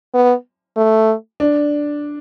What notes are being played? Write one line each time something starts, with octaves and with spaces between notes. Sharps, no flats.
B3
A3
D4